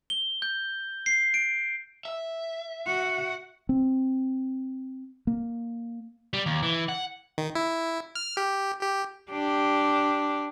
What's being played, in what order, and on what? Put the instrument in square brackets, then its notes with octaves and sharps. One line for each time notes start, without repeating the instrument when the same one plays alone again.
[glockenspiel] G7
G6
C7
D7
[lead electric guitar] E5
[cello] F#4 F#5
[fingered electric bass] C4
A#3
[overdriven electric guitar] G3
D#2
E3
F#5
[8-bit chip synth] D#3
E4
F6
G4
G4
[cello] D4 G4